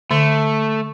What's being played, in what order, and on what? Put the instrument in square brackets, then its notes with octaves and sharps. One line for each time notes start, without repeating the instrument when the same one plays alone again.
[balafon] D3 [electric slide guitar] A3